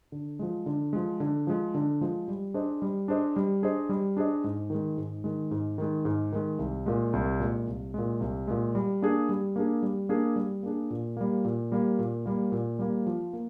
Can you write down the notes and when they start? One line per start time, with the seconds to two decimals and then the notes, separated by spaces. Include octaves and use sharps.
0.12 D3
0.39 F3 G#3
0.66 D3
0.93 F3 G#3
1.20 D3
1.47 F3 G#3
1.75 D3
2.01 F3 G#3
2.28 G3
2.54 D4 G#4 C5 D#5
2.82 G3
3.08 D4 G#4 C5 D#5
3.36 G3
3.62 D4 G#4 C5 D#5
3.89 G3
4.17 D4 G#4 C5 D#5
4.44 G#2
4.70 D#3 G#3
4.97 G#2
5.24 D#3 G#3
5.51 G#2
5.78 D#3 G#3
6.05 G#2
6.32 D#3 G#3
6.59 C2
6.86 A#2 G#3
7.13 C2
7.40 A#2 G#3
7.67 C2
7.94 A#2 G#3
8.20 C2
8.47 A#2 G#3
8.75 G3
9.02 A#3 D4 G#4
9.29 G3
9.56 A#3 D4 G#4
9.82 G3
10.09 A#3 D4 G#4
10.36 G3
10.63 A#3 D4 G#4
10.90 A#2
11.17 G3 A#3
11.45 A#2
11.72 G3 A#3
11.99 A#2
12.26 G3 A#3
12.52 A#2
12.79 G3 A#3
13.06 F3
13.33 A#3